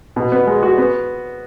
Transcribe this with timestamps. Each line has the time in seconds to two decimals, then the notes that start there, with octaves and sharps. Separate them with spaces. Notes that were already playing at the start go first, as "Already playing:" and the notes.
0.16 B2
0.32 B3
0.47 G#3
0.63 F#4
0.78 B3